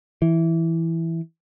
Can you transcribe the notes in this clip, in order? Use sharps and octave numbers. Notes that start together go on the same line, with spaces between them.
E3